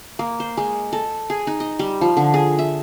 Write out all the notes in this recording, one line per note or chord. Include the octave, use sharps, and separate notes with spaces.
A#3
C5
G#3
A4
G#4
D#4
D#5
G3
F3
D3
G#4
E5